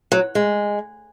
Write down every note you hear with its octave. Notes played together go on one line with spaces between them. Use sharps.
F#3
G#3